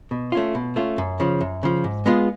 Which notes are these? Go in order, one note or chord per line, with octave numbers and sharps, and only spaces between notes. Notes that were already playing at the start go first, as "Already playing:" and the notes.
B2
A3 C#4 F4
B2
A3 C#4 F4
F#2
C#3 F3
F#2
C#3 F3
G#2
G#3 B3 F4 G#4